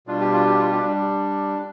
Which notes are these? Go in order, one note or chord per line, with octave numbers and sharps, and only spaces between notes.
B2 G3 D4 F4
G4
F4
G4
F4
G4
G3 D4